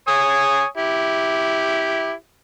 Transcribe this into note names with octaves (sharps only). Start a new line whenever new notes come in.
C#5 G#5 D#6
E4 G4